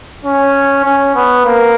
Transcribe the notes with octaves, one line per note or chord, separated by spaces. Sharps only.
C#4
C#4
B3
A#3